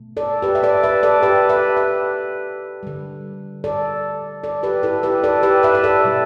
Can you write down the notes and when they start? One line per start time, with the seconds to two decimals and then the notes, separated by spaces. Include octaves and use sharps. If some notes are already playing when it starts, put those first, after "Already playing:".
Already playing: B2 A3
0.17 A4 D5
0.42 G4 B4
0.55 E5
0.63 A4 D5
0.83 B4 E5
1.03 A4 D5
1.23 G4 B4
1.49 B4 E5
1.77 B4 E5
2.83 D3 G3
3.64 A4 D5
4.43 A4 D5
4.63 G4 B4
4.83 E4 A4
5.03 G4 B4
5.24 A4 D5
5.43 G4 B4
5.63 B4 E5
5.75 E5
5.84 A4 D5
6.04 B2 G3